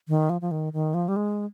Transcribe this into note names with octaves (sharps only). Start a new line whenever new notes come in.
D#3
F3
F3
D#3
D#3
F3
G3
G#3